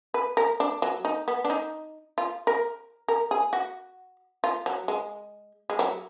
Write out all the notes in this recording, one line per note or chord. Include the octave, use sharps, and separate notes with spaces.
B4
A#4
D4
F#3
D#4
B3
D4
D#4
F4
A#4
A#4
G#4
F#4
F4
F#3
G#3
G#3
F#3